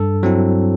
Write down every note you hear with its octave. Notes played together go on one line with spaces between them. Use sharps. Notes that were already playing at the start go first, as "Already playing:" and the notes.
Already playing: G2 A4
F#3 C4 E4